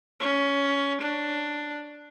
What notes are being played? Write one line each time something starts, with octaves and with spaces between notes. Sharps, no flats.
C#4
D4